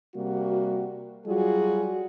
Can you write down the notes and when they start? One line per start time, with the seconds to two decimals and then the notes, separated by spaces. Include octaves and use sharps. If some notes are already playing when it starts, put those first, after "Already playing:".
0.15 C3 G3 A#3 F#4
1.26 F#3 G3 F4 F#4 G#4